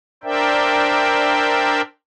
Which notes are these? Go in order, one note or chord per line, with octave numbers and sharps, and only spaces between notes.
D4 A#4 C5 D5 E5 G5